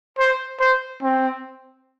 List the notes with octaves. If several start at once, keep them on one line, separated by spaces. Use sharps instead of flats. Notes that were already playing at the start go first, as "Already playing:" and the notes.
C5
C5
C4